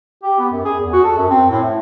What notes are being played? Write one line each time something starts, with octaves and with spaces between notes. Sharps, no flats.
G4
B3
F#2
G#4
E2
F#4
A4
F#2
C4
A2
A3